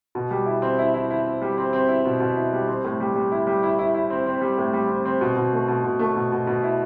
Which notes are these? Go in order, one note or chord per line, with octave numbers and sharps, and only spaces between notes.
B2
G3
E4
C4
E4
E4
E4
C4
G3
C4
C4
E4
B2
B2
E4
G3
C4
A2
G3
G3
E4
G3
E4
E4
E4
C4
C4
G3
A2
G3
C4
C4
B2
B2
A3
B2
B2
A3
B2
B2
B2
E4